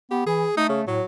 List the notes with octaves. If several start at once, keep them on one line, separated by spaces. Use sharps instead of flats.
B3 G4
E3 G#4
A3 D#4
C#3
A2 F#3